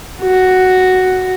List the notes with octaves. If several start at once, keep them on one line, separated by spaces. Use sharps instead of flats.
F#4